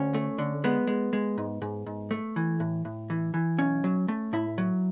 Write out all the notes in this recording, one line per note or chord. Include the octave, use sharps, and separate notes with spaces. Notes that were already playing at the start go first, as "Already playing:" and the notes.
Already playing: D2 C#4
A3
D3
G#3 B3
G#3
G#3
G#2
G#2
G#2
A3
E3
A2
A2
E3
E3
B1 C#4
F#3
A3
A2 E4
F#3